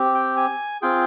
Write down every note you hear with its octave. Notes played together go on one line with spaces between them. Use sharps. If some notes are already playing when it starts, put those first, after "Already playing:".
Already playing: C4 G4
G5
G#5
C4 F4 G#4 G5